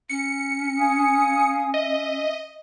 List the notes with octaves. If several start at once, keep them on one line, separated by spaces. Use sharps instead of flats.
C#4 C#7
F5 G#5 D#6
D#5 E5